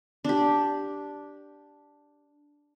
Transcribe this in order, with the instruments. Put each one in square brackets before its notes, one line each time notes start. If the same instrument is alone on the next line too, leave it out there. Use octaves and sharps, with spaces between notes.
[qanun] D4 G4